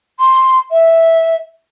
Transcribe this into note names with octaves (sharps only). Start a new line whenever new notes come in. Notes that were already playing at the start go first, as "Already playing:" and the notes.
C6
E5